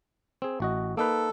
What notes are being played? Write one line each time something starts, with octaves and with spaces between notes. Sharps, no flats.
C4 G#4
A1 F#4 D#5
A#3 D#4 A4 B4